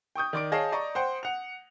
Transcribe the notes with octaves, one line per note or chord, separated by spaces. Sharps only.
G5 C#6 D#6 G6
D#3 D5 D6 D7
G#4 C#5 D#5 F5 A5
D5 D#5 A#5 C#6
C5 F#5 G5
F#5 F7